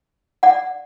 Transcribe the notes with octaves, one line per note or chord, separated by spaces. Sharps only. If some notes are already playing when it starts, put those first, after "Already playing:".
D5 F#5